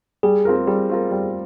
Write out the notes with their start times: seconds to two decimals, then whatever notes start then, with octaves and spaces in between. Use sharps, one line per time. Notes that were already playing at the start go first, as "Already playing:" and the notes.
0.23 G3 G#4
0.45 C4 F4 A#4
0.67 G3 G#4
0.90 C4 F4 A#4
1.11 G3